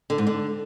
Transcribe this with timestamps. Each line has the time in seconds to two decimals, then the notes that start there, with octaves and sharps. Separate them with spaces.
0.10 D3
0.18 G#2
0.27 D3